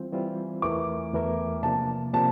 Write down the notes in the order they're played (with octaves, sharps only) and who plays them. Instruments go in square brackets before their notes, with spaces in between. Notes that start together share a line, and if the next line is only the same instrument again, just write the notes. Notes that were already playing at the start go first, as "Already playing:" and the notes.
Already playing: [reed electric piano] E3 G3 C4 F4 C5
E3 G3 C4 F4 C5
[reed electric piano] E2 E3 A3 E4 A#4 [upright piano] D6
[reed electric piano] E2 E3 A3 E4 A#4
[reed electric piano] C3 F3 A#3 D4 [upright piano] A5
[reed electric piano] C3 F3 A#3 D4 [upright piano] A5